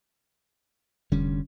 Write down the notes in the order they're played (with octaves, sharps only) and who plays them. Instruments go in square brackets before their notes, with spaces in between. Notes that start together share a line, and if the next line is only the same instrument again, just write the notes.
[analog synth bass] F1 [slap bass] D3 G3 C#4